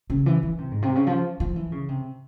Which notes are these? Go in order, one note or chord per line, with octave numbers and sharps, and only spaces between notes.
C#3
E3
E3
C3
G#2
C3
C#3
F3
F3
E3
C#3
C3